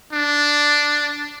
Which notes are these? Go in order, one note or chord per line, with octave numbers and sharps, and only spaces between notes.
D4